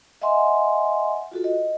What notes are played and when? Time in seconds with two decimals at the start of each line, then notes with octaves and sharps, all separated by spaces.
0.21 D#5 E5 F#5 G#5 C6
1.32 F4 F#4 A4
1.44 D#5